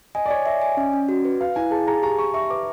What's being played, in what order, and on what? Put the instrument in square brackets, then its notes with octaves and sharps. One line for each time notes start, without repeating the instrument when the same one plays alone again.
[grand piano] D#5 [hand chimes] G#5
[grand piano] D5
[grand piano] C#5 [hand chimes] G#5
[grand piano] D5 [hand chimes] E5
[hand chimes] G#5
C#4
C#4
F#4
B4
[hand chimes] B4 [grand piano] F5
[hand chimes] E4 [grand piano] G#5
[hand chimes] G#4 [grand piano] A5
[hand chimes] G#4 [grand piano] A#5
[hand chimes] G4 [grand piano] A#5
[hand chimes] G4 [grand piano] C#6
[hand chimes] E5 [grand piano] C#6
[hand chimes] B4 [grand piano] D6